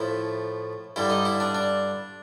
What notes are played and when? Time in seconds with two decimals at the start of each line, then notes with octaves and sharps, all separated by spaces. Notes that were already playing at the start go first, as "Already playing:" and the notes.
Already playing: A2 F3 A3 E4
0.96 G2 D3 G3 E4
1.10 D#4
1.25 E4
1.40 D4
1.55 D4